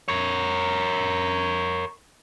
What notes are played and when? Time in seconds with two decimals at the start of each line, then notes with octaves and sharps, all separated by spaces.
0.08 A#4 C#5